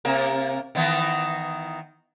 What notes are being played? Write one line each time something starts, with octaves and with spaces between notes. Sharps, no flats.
C3 A#3 A#4
D#3 E3 B3